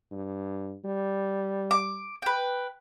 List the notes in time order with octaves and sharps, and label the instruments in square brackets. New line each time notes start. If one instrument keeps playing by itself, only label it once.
[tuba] G2
G3
[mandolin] D6
B4 G5